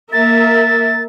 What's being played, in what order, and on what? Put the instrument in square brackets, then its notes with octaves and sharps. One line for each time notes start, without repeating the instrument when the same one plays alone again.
[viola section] A#3 A#4 E5 [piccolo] A6